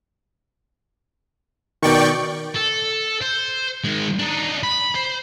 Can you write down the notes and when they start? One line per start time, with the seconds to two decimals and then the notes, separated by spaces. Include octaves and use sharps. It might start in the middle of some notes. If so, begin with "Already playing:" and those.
1.82 B2 D#3 D5 G5 C#6
2.56 A4
3.21 C5
3.84 D#3 G#3
4.19 D4 D#4
4.63 B5
4.95 C5